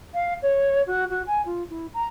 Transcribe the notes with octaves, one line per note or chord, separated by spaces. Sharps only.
F5
C#5
F#4
F#4
G#5
F4
E4
A#5